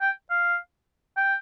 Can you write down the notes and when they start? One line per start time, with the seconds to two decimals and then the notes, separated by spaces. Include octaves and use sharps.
0.01 G5
0.30 F5
1.17 G5